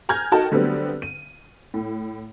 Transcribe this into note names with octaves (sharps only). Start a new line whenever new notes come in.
G#5 A#5 F6 G6 G#6
D#4 F#4 A4 A#4 G5 A5
D3 F#3 G3 A3 B3 C4
D#7
A2